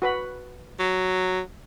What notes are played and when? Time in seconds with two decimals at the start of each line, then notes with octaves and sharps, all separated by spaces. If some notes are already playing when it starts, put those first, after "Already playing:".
0.02 F#4 B4 B5
0.80 F#3